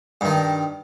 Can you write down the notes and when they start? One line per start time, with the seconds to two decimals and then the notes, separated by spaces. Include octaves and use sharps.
0.21 G2 D#3